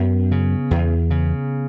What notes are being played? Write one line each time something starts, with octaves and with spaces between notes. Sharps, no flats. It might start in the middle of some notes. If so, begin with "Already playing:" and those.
Already playing: F#2 B3
C#3
E2
C#3